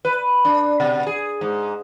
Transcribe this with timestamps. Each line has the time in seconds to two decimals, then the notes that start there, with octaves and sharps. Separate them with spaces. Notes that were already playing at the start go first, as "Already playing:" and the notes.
0.05 B4
0.45 D4
0.80 B2
1.07 G#4
1.41 G#2